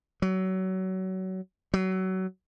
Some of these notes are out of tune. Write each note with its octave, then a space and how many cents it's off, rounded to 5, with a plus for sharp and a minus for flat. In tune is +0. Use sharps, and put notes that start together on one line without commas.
F#3 +25
F#3 +25